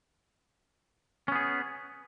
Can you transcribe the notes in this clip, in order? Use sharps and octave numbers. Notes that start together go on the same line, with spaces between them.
B3 C#4 G#4